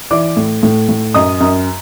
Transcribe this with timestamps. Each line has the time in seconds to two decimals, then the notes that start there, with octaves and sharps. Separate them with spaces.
0.11 E3 D5 D6
0.37 A2
0.63 A2
0.89 A2
1.14 F#2 D#5 D#6
1.40 F#2